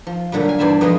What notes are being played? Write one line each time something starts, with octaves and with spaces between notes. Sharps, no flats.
F3
A#2 D3 F#3 G3
F5 G#5
E2 G2 C5 G#5 A5 B5
F2 B2 F3 G#3 C4 D#5